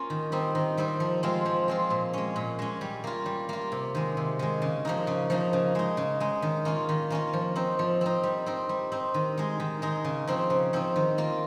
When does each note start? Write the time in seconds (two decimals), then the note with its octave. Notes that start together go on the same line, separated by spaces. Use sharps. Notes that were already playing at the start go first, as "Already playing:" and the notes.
Already playing: A#3 C#4 F4
0.10 D#3
0.32 G3 C4 D#4
0.55 D#3
0.77 G3 C4 D#4
1.00 F3
1.23 G#3 C4 F4
1.46 F3
1.68 G#3 C4 F4
1.90 A#2
2.13 G#3 C#4
2.36 A#2
2.59 G#3 C#4
2.81 G3
3.04 A#3 F4
3.26 G3
3.49 A#3 F4
3.72 C3
3.95 D#3 G#3
4.17 C3
4.39 D#3 G#3
4.62 C#3
4.85 F3 A#3 D#4
5.07 C#3
5.30 F3 A#3 D#4
5.53 C#3
5.75 G#3 D#4
5.97 C#3
6.20 G#3 D#4
6.42 D#3
6.65 A#3 C#4 F4
6.89 D#3
7.10 A#3 C#4 F4
7.33 F3
7.56 C4 D#4
7.79 F3
8.01 C4 D#4
8.23 G3
8.46 C4 D#4
8.69 G3
8.92 C4 D#4
9.14 D#3
9.38 G#3 D#4
9.60 D#3
9.82 G#3 D#4
10.04 C#3
10.27 F3 C4 D#4
10.50 C#3
10.73 F3 C4 D#4
10.96 D#3
11.18 A#3 F4